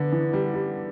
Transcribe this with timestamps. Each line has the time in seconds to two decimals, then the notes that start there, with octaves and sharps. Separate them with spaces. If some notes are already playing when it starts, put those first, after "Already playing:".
Already playing: D3 B3 D4 B4 D5
0.12 E3
0.33 G3
0.54 G3